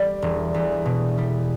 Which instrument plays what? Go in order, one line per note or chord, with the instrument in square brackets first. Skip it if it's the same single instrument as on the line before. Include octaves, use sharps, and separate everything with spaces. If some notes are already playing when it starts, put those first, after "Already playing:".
Already playing: [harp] G3 [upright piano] D5
[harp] E1
E2
B2
G3